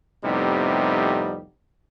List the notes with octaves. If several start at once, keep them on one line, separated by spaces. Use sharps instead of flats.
F2 A2 C3 G3 B3 D#4